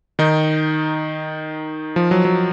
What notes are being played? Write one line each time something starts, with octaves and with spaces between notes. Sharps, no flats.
D#3 D#4
F3
F#3
F#3